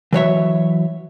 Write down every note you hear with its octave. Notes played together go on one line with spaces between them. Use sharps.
E3 F#3 C#5 E5